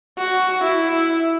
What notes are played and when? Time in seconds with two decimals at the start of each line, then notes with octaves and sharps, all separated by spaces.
0.18 F#4
0.63 E4